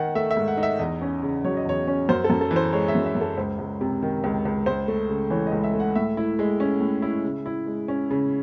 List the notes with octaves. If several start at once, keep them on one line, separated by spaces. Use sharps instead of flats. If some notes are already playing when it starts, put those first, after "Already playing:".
Already playing: D#3 D#4 F#5
A3 E5
E5
G#2
F#5
D#4
E5
E2 D#5
C#4
C#3
F#3 C#5
D#5
E2 C#5
C#4
F#2 C5
A4
F#2
A4
E3
C5
G#3 C#5
E5
F#2
E5
F#2
A4
C#2 C5
C#2
C3
D#3
C#2
C#2
C#2 C5
A3
C#3
E3 C#5
D#5
C#2
E5
A3
F#5
A2 E5
E4
G#3
C#4
A2
E4
C#3
E4
G#3
C#4
C#3